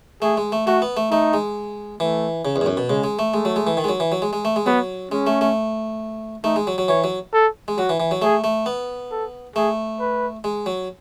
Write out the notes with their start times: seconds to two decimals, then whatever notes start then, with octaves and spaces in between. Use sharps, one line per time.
0.22 A3 G#4
0.37 G#3
0.52 A3
0.67 A3 F#4
0.82 B3
0.97 A3
1.11 A3 D#4
1.33 G#3
2.00 E3 A3
2.45 C#3
2.56 E2
2.61 G#2
2.66 F#2
2.77 B2
2.89 C#3 G#3
3.04 G#3
3.19 A3
3.34 G#3 A3
3.45 F#3
3.56 G#3
3.67 E3
3.77 D#3
3.84 G#3
3.89 F#3
4.00 E3
4.12 F#3
4.22 G#3
4.33 G#3
4.45 A3
4.56 G#3
4.66 F#3 B3
5.11 G#3 C#4
5.27 A3
5.41 A3
6.44 A3 D#4
6.56 G#3
6.67 F#3
6.78 F#3
6.88 E3 C#5
7.04 F#3
7.34 A4
7.68 G#3
7.78 F#3 F#4
7.89 E3
8.00 E3
8.11 F#3
8.22 A3 G#4
8.44 A3
8.66 B3
9.12 A4
9.56 A3 G#4
10.00 B4
10.44 G#3
10.66 F#3